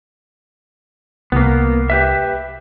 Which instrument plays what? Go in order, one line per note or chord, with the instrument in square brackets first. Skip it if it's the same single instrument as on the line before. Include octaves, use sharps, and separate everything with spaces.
[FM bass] C2 [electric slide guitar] A#3 B3
[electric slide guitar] G4 B4 E5